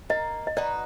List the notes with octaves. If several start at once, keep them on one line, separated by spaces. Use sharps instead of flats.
A#3 D#5
D#5
D#4 F#4 B4 D5